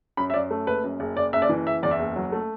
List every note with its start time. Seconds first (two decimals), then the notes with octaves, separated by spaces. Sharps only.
0.17 F#2 B5
0.30 E5
0.34 F#2 D5
0.51 A3
0.67 F#1 B4
0.84 F#2
1.00 F#1
1.17 F#1 D5
1.33 F#1 E5
1.42 D5
1.49 E3
1.66 F#1 E5
1.83 E2 D5
1.91 E5
1.99 F#1
2.16 F#3
2.32 A3